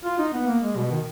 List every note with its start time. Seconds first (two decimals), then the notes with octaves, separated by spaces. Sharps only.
0.05 F4
0.19 D#4
0.33 B3
0.47 A#3
0.63 G#3
0.76 B2
0.91 D#3